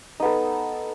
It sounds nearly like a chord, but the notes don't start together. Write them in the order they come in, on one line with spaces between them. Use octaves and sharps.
D#4 B3 A4